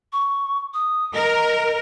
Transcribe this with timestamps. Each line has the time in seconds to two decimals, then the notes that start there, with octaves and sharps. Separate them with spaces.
0.13 C#6
0.74 D#6
1.15 A#4 D#5